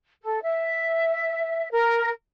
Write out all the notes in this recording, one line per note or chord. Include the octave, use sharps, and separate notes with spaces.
A4
E5
A#4